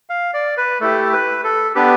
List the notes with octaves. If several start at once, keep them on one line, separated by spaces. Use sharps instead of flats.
F5
D5
B4
A3 E4 G4 A4
B4
A4
B3 D4 G4 B4